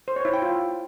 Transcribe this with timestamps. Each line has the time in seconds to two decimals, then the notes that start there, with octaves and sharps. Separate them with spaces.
0.08 C5
0.16 C#5
0.25 E4
0.34 G5
0.42 F4